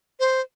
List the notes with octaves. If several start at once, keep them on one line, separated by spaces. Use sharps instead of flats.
C5